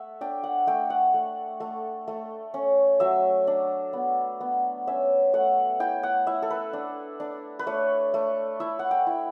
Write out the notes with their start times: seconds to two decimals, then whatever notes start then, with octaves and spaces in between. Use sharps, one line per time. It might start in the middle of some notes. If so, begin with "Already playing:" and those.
Already playing: A3 E5 F#5
0.21 D4 G5
0.44 F#5
0.67 A3 G5
0.90 F#5
1.14 A3
1.60 A3
2.08 A3
2.54 C#4
3.00 F#3 E5
3.47 D4
3.93 B3
4.41 B3
4.87 C#4 E5
5.34 A3 F#5
5.80 E4 G5
6.03 F#5
6.27 E4 E5
6.42 A4
6.51 B4
6.73 D4
7.20 D4
7.59 B4
7.67 A3 C#5
8.14 A3
8.60 E4 E5
8.79 F#5
8.91 G5
9.07 E4